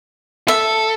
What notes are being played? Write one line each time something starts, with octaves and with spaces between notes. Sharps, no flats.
A4 E5